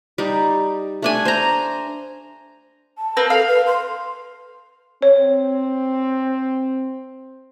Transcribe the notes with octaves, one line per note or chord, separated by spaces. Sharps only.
G3 D#4
A3 D4 G#5
C5 A#5
A5
A#3 C4 B4
A4 F5
B4
C6
C4 C#5